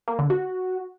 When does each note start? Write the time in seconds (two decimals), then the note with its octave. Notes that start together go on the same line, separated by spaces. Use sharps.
0.08 A#3
0.19 D3
0.30 F#4